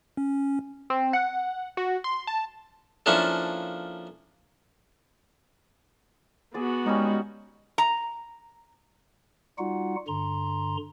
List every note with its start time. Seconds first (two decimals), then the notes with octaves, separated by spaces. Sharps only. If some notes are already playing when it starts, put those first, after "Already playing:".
0.17 C#4
0.90 C4
1.13 F#5
1.77 F#4
2.04 C6
2.27 A5
3.06 F3 A#3 C#4 D4 E4 A4
6.54 B3 F#4 G#4 D5
6.86 G3 G#3 C#4 D#4
7.78 A#5
9.58 G3 D#4 F4 F#4 F#5
10.08 G2 D3 A#5 C6